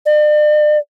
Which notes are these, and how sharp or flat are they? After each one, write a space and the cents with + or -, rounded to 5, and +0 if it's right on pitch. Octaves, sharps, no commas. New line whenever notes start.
D5 +40